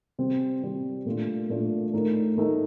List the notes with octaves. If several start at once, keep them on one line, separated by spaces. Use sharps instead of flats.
C3 G3 C4
C3 G3 C4
A#2 A3 D4 F4
A#2 A3 D4 F4
A2 A3 D#4 A#4
A2 A3 D#4 A#4